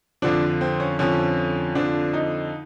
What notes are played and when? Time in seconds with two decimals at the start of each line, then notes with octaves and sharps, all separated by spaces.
0.22 F2 D3 F3 D4
0.61 C4
0.80 C#4
0.99 F2 D3 F3 C#4
1.75 F2 D3 F3 D4
2.14 D#4